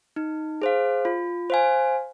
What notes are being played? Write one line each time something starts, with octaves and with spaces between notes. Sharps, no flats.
D#4
G#4 C5 F5
F4
C5 F5 G#5